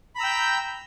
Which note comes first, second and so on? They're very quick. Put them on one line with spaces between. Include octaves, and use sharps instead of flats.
B5 A#5 E6 G5 G6